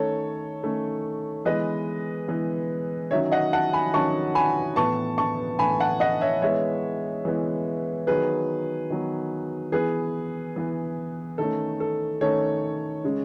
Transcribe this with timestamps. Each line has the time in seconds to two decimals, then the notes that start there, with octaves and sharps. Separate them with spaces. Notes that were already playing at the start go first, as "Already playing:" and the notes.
Already playing: D#3 A3 C#4 A4 C#5
0.63 D#3 A3 C#4
1.45 E3 G#3 B3 B4 D#5
2.28 E3 G#3 B3
3.11 D#3 F#3 C#4 C#5 E5
3.32 D#5 F#5
3.53 F#5 A5
3.73 G#5 B5
3.93 D#3 F#3 C#4 A5 C#6
4.35 G#5 B5
4.76 A2 E3 B3 A5 C#6
5.18 A5 C#6
5.59 A2 E3 B3 G#5 B5
5.80 F#5 A5
6.00 D#5 F#5
6.21 C#5 E5
6.42 E3 G#3 B3 C#5 E5
7.25 E3 G#3 B3
8.07 D#3 F#3 B3 G#4 B4
8.90 D#3 F#3 B3
9.72 E3 B3 G#4 B4
10.56 E3 B3
11.38 D#3 A3 C#4 A4
11.80 A4
12.21 D#3 A3 C#4 A4 C#5
13.04 C#3 G#3 C#4